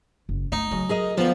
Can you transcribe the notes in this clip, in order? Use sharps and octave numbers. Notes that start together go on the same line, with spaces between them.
F#1
A3 D#4
C#3 F#3
G#4 A#4 D#5
D2 F3 B3 F4